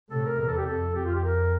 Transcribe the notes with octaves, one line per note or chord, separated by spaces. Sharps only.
A2 C3 A4
A#4
E2 A#4
A4
G4
F2 A4
F2 G4
F4
G4
A#4